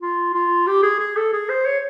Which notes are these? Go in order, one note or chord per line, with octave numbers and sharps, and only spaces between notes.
F4
F4
G4
G#4
G#4
A4
G#4
C5
C#5